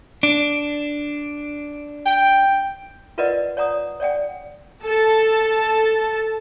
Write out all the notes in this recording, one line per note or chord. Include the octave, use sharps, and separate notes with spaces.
D4
G5
F4 A#4 B4 D5 D#5 F#5
C#5 D5 F#5 A#5 D#6
C#5 D5 F#5 G5
A4 A5